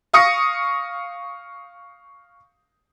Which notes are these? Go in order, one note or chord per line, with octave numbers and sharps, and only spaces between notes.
F5 C#6 D#6 A#6 C#7